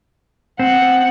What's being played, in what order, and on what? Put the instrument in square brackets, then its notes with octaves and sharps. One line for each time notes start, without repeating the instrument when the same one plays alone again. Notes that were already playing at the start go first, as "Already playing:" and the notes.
[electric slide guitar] C4 [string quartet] F#5